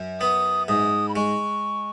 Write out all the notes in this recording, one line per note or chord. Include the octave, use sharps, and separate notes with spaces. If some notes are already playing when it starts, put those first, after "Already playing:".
Already playing: F#2
B3 D#6
G#2 D#6
B5
G#3 C#6